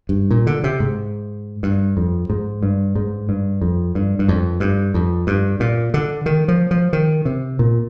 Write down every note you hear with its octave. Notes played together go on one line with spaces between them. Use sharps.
G2
A#2
D3
C3
G#2
G2
F2
G#2
G2
G#2
G2
F2
G2
G2
F2
G2
F2
G2
A#2
D3
D#3
F3
F3
D#3
C3
A#2